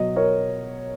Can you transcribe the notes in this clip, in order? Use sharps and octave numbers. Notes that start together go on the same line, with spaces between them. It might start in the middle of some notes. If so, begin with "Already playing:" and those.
Already playing: B2 F#3 D#5
A#4 C#5